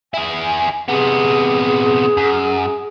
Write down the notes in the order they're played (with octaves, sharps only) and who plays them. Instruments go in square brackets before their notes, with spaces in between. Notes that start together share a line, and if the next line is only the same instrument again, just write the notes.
[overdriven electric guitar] E4 G#4 [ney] G#5
[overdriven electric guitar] C3 B3 [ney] G#4
[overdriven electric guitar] F#2